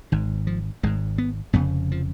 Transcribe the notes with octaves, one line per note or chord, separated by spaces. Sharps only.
G#1 G#2 D#3
F3
G#1 G#2 G#3
B3
F1 F2 C#3 B3
F3